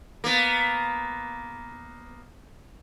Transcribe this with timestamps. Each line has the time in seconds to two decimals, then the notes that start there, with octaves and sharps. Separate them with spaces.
0.24 A#3 B3